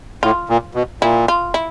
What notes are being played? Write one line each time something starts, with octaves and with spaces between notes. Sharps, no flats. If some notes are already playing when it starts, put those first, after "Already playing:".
A2 F4
A#2
B2
A#2 E4
F4
E4